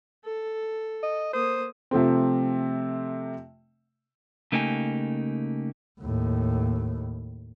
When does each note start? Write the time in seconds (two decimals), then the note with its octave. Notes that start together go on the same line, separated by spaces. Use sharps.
0.25 A4
1.03 D#5
1.33 A#3 C5 D#6
1.91 C3 F3 A3 C4
4.52 C#3 A3 A#3 D#4 G4 G#5
6.01 D#2 A2